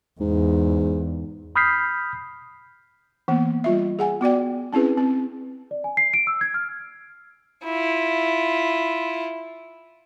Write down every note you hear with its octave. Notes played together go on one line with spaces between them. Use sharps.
E2 G#2
B5 D#6 F6 G6 B6 C7
E3 A#3 B3
G3 F4 E5
G#4 F#5 G#5
B3 F#4 D5 G5
C4 C#4 E4 G#4 B4
C4
D5
G#5
C7
D7
E6
G#6
F6
E4 F4